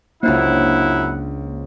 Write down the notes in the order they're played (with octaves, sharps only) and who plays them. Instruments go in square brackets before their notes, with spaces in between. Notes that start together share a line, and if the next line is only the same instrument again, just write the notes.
[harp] C#2 F4 C5 [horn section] F#2 E4 [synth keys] A#3 D4 [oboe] F#5